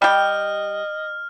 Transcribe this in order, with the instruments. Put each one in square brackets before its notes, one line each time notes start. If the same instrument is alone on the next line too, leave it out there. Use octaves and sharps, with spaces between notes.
[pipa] G3 G4 [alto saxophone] D#5 [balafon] G5 [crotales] F6